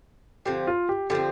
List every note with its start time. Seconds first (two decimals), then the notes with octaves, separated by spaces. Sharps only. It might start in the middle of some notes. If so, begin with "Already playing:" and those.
0.45 D3 F3 C4 G4
0.67 F4
0.89 G4
1.10 D3 F3 C4 G4